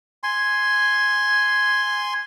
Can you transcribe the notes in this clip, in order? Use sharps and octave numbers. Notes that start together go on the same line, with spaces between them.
G#5 C6